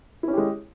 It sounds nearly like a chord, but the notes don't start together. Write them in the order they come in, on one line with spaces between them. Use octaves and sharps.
E4 C#4 G4 G#3